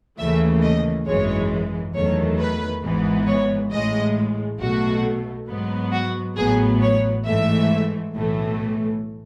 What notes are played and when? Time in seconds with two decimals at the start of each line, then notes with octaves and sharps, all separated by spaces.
0.18 D#2 C#3 E3 A3 E5
0.62 D#5
1.06 G#1 F#2 E3 G#3 C#5
1.94 E2 D#3 F#3 A3 C#5
2.39 B4
2.83 G#1 G#2 E3 B3
3.27 C#5
3.71 A1 A2 G#3 D#5
4.60 B1 B2 A3 F#4
5.48 G#2 F#3 B3
5.92 F#4
6.36 A1 A2 F#3 B3 G#4
6.81 C#5
7.25 G#2 E3 A3 E5
8.14 B1 A2 E3 A3